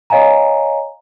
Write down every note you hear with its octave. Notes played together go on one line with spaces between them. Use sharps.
C#5 D#5 F5 G#5 A#5